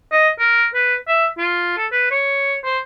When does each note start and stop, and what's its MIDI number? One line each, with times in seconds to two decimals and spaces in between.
0.12 0.29 75
0.39 0.66 70
0.75 0.95 71
1.08 1.26 76
1.38 1.72 65
1.77 1.86 69
1.92 2.09 71
2.11 2.56 73
2.64 2.79 72